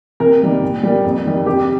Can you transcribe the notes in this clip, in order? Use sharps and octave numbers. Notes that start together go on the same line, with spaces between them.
C3 A#4
D#3 G3 A#3
A#2
G3 A#3
F2
D#3 G3
C3 G4